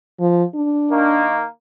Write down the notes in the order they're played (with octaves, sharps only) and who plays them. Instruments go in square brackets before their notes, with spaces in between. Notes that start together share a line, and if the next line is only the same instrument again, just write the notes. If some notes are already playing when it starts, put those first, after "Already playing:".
[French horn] F3
D4
[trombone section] D#3 A#3